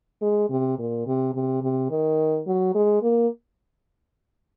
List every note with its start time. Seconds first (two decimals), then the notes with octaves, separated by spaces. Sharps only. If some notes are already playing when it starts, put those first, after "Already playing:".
0.22 G#3
0.50 C3
0.79 A#2
1.07 C3
1.35 C3
1.62 C3
1.90 D#3
2.47 F#3
2.75 G#3
3.02 A#3